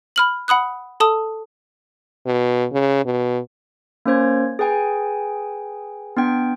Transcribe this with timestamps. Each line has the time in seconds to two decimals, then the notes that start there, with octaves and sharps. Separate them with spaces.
0.16 B5 F6 F#7
0.48 F#5 B5 D#6 F#6
1.00 A4 A5 D#6
2.26 B2
2.72 C#3
3.06 B2
4.06 A#3 C#4 C5 G#6
4.59 G#4 B4 G5 G#5
6.17 B3 D4 G5